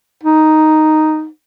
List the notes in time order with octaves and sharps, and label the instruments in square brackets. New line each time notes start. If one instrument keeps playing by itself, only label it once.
[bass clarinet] D#4